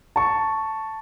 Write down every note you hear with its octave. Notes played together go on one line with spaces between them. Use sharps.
A5 C#6